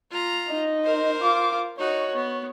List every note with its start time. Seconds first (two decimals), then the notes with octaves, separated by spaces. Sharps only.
0.11 F4 A#5
0.47 D#4 D#5
0.84 A#4 C5
1.21 F4 D6
1.78 D#4 F#4 C#5
2.16 B3